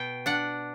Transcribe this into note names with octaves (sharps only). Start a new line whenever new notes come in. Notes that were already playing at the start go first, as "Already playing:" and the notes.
Already playing: B2 G5
D4 F#5